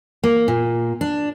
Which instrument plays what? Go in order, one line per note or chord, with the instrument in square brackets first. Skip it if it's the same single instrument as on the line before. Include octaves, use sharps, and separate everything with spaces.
[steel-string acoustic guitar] A#3
A#2
D4